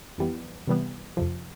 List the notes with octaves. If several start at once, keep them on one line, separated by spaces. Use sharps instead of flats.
F2 E3 G3 B3
C3 E3 G3 B3
F2 C3 F3